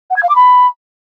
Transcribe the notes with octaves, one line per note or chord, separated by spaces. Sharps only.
F#5
G#6
F5
D6
B5